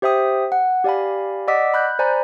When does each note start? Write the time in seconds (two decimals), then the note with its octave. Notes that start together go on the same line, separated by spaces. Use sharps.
0.02 G4 C5 E5 G5 D#6
0.52 F#5
0.84 G4 D5 F5 G#5 B5
1.48 D5 D#5 F#5 D6 E6 B6
1.74 B5 F#6 G6
1.99 C5 D5 G#5 A#5 B5